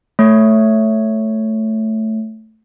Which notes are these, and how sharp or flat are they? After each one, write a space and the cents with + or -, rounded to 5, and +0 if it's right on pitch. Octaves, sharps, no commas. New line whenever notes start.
A3 +0 C#5 +0